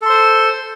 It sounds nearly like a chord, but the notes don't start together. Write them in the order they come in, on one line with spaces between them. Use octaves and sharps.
A4 C6 C5